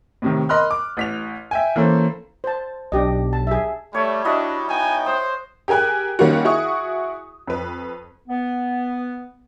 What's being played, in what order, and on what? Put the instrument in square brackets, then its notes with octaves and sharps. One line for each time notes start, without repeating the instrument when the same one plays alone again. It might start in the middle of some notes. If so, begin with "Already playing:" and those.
[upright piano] A2 C3 D#3
A#4 D#5 B5 C6 F6 F#6
D6
A1 B6 F7
E5 G5 G#5
E3 A#3 C#4 A4 C5
[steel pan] C5 A5
[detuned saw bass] B1 [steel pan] D4 G4 D#5
[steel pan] A5
G#4 E5
[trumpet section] G3 [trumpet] A3 [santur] C#5
[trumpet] D4 [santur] E4 F#4 D#5
[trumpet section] B3 D#4 G5 [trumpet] G#5
[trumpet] C5 [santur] D#6
[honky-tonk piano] G4 G#4 A#4 G#5 F#6
D#3 G3 A#3 C#4 F4 F#4
E4 F#4 G#4 C#6 D#6
F2 B4
[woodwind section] B3